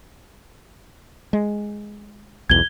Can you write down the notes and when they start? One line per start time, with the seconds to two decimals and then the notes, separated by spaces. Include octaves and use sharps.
1.33 G#3
2.50 B1 E2 G#6 G7